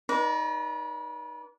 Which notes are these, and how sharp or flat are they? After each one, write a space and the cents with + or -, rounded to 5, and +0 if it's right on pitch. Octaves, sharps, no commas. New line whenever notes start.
D#4 +0 B4 -40 D5 -30